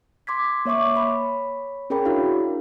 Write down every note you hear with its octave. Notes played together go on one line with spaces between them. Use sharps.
C6 D6 G#6 B6
A#3 C#5 E5 C#6 D6
C#5 B5
C#4 G#4 A#4 C#5 G5 B5
D4 E4 F#4 G#4 A#4 F5